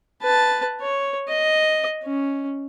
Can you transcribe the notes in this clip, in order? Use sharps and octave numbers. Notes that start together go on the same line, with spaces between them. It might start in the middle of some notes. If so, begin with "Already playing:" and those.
B4 A5
C#5
D#5
C#4